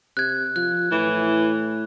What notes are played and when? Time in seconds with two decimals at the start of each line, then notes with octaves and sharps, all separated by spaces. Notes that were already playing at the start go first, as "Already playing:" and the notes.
0.17 C3 F#6 G#6
0.56 F3 F#6
0.91 A2 E3